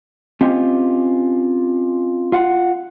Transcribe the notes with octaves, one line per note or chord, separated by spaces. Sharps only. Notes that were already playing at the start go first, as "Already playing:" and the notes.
C4 C#4 F4 G4 D#5
F4 F5 F#5